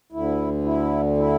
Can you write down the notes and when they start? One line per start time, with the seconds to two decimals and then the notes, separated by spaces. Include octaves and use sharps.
0.12 D2 D3 E4
0.64 E4
1.17 E4